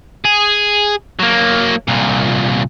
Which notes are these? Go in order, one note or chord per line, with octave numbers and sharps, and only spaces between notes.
G#4
F#3 A#3
C2 A#2